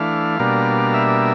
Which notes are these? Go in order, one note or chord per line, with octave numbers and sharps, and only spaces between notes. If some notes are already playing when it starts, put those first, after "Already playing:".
Already playing: E3 A3 D4 F5
B2 G3 A#3 D4
E5